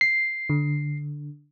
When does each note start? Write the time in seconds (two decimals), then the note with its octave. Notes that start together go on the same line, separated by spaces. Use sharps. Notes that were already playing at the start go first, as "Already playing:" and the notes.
0.01 C7
0.50 D3